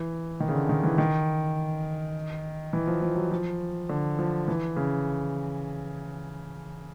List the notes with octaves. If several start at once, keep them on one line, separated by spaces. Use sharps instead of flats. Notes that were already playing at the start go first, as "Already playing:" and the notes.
Already playing: E3
D#3
C#3
D3
D#3
E3
D#3
E3
F3
F3
F#3
F3
D3
F3
E3
C#3